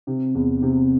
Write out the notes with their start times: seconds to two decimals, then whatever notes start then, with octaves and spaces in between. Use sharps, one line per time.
0.07 C3
0.35 E2
0.62 C3